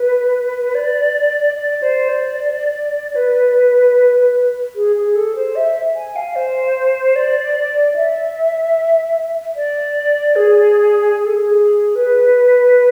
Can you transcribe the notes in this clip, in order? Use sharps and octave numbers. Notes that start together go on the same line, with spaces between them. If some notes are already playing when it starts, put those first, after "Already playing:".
Already playing: B4
D5
D5
C5
D5
B4
G#4
G#4
A4
C5
E5
G#5
F5
C5
D5
D5
E5
D5
G#4
G#4
A4
G#4
B4